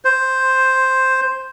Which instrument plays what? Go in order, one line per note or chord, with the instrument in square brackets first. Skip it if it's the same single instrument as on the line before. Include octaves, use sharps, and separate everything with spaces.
[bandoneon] C5